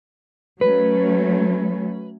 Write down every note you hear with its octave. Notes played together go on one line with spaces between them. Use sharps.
F#3 A3 C#4 B4